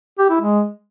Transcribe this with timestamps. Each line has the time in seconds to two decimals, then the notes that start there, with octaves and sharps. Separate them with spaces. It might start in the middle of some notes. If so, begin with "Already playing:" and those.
0.19 G4
0.30 E4
0.41 G#3